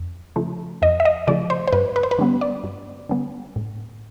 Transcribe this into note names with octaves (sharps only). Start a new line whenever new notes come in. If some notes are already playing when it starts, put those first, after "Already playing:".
Already playing: F2
C#3 F3 A3
F2 D#5
E5
D#5
C#3 F3 A3 D5
C5
C5
G2 B4
B4
C5
B4
D3 G3 B3
D5
G2
D3 G3 B3
A2